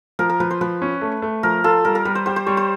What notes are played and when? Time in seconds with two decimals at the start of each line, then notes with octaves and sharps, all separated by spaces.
0.19 F3 A#4
0.29 A#4
0.40 F3 B4
0.51 C5
0.61 F3 B4
0.82 C#4
1.02 A3
1.22 A3
1.43 F3 A#4
1.64 F4 A4
1.85 G3 A#4
1.95 A#4
2.05 G3 B4
2.15 C5
2.26 G4 C5
2.36 C5
2.46 G3 C#5
2.57 C5